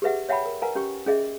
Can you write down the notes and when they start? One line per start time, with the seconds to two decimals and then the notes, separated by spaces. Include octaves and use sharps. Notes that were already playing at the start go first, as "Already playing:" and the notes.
0.02 G4 G#4 B4 E5 F#5
0.29 C#5 E5 F#5 G5 A5 B5
0.46 A#4
0.62 A#4 B4 F#5 G#5 A#5
0.75 C#4 G4 G5 C#6
1.07 C#4 G#4 D#5 E5